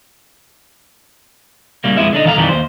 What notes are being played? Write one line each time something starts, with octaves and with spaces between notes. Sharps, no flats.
C#3 G3 A#3
F2 G#3 B3 E4 E5
D3 D4 D#4
D#3 E3 A4 F5 F#5 A#5
F2 D#3 E3 G3
D#2 C5